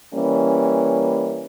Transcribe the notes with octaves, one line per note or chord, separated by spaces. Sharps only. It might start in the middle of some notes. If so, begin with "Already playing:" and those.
E3 G3 A#3 C#4